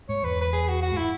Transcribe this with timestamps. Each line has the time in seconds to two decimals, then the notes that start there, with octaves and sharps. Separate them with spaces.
0.09 G#2 C#5
0.23 E2 B4
0.42 B4
0.53 G#4
0.68 F#4
0.82 F#4
0.92 G#2
0.97 E4